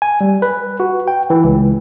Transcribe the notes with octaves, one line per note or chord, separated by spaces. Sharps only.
G#5
G3
B4
F#4
G5
E3
C#2